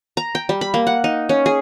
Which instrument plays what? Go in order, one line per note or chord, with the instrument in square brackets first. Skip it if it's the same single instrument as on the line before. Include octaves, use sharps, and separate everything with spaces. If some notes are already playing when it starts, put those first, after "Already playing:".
[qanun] A#5
G5
G3
B5
A#3
F#5
D#4
C#4
G#4